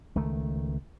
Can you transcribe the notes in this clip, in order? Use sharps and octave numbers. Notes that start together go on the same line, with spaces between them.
C#2 D#3 A3